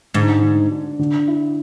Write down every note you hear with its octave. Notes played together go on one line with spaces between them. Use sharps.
G#2 D3
D3
D4
D3
E4